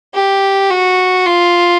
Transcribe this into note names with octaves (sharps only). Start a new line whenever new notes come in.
G4
F#4
F4